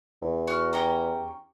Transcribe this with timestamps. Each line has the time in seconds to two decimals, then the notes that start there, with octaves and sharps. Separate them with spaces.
0.22 E2
0.47 F#4 F6
0.73 C#4 G4 A#5